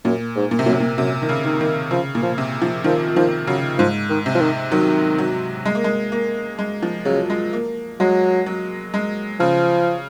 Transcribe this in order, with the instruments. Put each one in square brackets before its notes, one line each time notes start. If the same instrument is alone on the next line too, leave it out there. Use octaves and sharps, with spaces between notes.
[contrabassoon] F#2 [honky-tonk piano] A#2
[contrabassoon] G#2
[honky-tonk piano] A#2
C3
[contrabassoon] F#2 [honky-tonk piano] A#2
[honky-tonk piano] C3
A#2
[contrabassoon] F#2 [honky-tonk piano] C3
[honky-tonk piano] D#3
C#3
[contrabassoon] D#3
[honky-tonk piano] D#3
[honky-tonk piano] C#3 [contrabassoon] F3
[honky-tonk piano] A#2
[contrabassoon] F3
[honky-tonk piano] C3
F3
[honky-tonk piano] D#3 [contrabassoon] F3
[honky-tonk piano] D#3 [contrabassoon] F3
[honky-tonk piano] C#3 [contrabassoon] F#3
[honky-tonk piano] G#2 [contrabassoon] F3
[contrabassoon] D#3
[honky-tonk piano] C3
[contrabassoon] F3
D#3
[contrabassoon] D#3 [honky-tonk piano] F#3
[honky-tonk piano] F#3
G#3
A#3
G#3
A#3
G#3
F3
[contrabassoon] C#3 [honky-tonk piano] F#3
[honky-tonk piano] G#3
A#3
[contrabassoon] F#3 [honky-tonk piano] G#3
[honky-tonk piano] F#3
G#3
[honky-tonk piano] C#3 [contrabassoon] F3